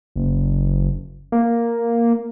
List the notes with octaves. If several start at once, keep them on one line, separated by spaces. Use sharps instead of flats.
F#1
A#3